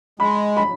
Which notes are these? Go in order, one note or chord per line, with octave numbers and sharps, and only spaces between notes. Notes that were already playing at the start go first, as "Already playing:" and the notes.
G#3 B5
B5